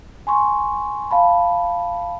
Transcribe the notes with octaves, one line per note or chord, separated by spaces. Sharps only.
G#5 C6 C#6
F5 A5 B5